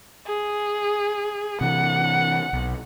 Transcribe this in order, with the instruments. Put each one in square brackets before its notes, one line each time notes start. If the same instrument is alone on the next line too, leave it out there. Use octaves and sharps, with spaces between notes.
[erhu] G#4
[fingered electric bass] C3 E3 [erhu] F#5
[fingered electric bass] B1